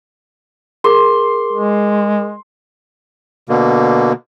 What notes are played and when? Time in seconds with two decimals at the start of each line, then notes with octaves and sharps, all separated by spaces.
0.84 G#4 A#4 C6 D6
1.53 G#3
3.49 B2 D3 A#3